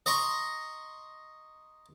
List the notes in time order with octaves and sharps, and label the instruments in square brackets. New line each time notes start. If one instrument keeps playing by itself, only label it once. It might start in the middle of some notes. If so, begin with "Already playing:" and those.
[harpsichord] D#5 A#5 C6 C#6